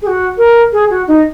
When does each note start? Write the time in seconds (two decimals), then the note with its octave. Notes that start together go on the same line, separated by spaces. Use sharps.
0.02 G#4
0.07 F#4
0.38 A#4
0.72 G#4
0.90 F#4
1.07 D#4